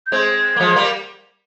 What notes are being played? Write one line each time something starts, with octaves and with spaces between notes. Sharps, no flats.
G6
G#3 C4 G#6
A#3
F3 G#3
G3 A#3